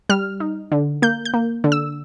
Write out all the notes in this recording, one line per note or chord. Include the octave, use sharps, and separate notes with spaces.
G3 F6
D#4
D3
A#3 G6
G6
A#3
D3
E6